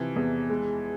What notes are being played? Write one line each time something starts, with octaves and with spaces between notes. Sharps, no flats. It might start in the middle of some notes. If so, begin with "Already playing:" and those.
Already playing: C3 E3 F3
E2
G#3